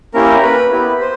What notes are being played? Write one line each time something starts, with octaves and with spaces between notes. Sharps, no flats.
A#3 C#4 E4 G4 A#4
B4
B3 E4 G4
C5